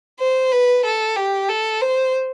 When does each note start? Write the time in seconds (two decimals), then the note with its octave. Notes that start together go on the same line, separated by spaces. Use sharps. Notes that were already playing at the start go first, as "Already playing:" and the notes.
0.20 C5
0.52 B4
0.85 A4
1.16 G4
1.49 A4
1.81 C5